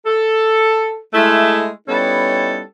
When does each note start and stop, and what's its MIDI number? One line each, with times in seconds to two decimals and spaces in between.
0.06 0.97 69
1.14 1.68 56
1.14 1.68 57
1.14 1.68 64
1.88 2.62 55
1.88 2.62 59
1.88 2.62 61
1.88 2.62 63
1.88 2.62 64
1.88 2.62 69